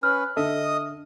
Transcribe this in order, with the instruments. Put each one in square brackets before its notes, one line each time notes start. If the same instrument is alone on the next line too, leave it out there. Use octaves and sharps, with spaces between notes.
[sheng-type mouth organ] C#4 B4 [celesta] F6
[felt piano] D3 [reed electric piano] A4 E5 [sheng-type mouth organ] D#5 D#6